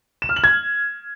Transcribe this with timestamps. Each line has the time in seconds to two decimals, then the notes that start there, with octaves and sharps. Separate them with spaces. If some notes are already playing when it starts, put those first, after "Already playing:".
0.22 E7
0.29 F6
0.36 F#7
0.44 G#6